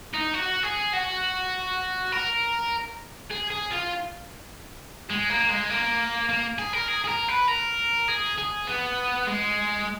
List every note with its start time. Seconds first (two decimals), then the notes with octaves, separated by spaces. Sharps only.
0.14 D#4
0.34 F#4
0.63 G#4
0.93 F#4
2.12 A#4
3.31 G#4
3.51 G#4
3.71 F4
5.10 G#3
5.30 A#3
5.49 G#3
5.70 A#3
6.29 A#3
6.59 G#4
6.73 A#4
6.88 G#4
7.04 G#4
7.08 A#4
7.28 B4
7.48 A#4
8.08 G#4
8.38 G#4
8.67 B3
9.27 G#3